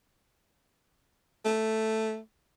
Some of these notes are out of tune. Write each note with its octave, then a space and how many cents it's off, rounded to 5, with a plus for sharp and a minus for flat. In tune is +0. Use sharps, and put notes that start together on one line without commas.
A3 +0